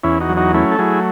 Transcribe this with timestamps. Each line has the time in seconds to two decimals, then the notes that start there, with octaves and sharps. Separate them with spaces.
0.03 E2 C#4 E4
0.20 D#4 F#4
0.29 F#3
0.37 D#4 F#4
0.54 A3 C#4 E4
0.72 A4
0.79 F#3 E4 G#4